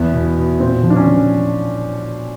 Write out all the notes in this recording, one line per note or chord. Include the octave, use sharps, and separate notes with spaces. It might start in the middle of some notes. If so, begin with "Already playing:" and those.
Already playing: E2 B3
B2
B2
A#2 C4
F3
D4
C#4
F3